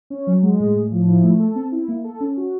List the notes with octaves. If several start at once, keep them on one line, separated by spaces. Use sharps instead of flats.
C#4
F#3
G#3
A2
A2
F3
E4
A3
A4
C4
E4
A#3
A4
C#4
F#4